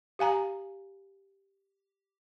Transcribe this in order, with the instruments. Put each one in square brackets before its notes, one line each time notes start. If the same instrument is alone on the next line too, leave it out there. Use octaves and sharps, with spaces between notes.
[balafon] G4 F5 G#5 A#5